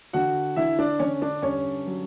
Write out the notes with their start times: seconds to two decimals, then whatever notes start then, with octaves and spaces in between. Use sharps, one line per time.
0.13 D3 F#4 F#5
0.56 D3 E4 E5
0.79 D4 D5
0.99 D3 C#4 C#5
1.22 D4 D5
1.42 G2 C#4 C#5
1.87 F#3